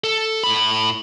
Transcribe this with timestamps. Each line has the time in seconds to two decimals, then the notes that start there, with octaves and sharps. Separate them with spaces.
0.04 A4
0.44 A2 B5